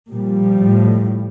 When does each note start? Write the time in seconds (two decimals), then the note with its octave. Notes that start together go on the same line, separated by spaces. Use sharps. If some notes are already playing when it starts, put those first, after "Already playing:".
0.11 A#2 F3 G3
0.63 A2